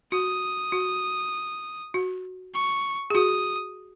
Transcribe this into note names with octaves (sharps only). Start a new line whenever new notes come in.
F#4 D#6
F#4
F#4
C#6
G#4
F#4 D#6